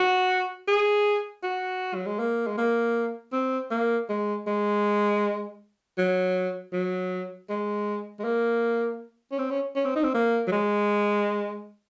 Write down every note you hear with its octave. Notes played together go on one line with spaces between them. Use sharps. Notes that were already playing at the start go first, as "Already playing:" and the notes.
Already playing: F#4
G#4
F#4
F#3
G#3
A#3
G#3
A#3
C4
A#3
G#3
G#3
F#3
F#3
G#3
G#3
A#3
C#4
C4
C#4
C#4
C4
D#4
C4
A#3
F#3
G#3